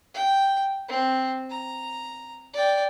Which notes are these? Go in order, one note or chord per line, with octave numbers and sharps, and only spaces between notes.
G5
C4
A#5
D5 G5